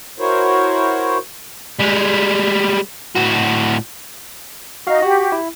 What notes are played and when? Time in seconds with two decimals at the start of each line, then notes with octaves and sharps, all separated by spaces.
0.19 E4 F#4 A#4 C5 C#5
1.79 G3 G#3
3.16 A2 F#4
4.87 D#4 F#4 D#5 F5
5.02 F#4 G4
5.32 E4